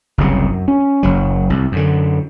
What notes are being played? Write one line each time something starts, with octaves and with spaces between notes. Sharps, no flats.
F#1 C2 C#3
F#2
C#4
F#1 F#3
C2
F#2 D3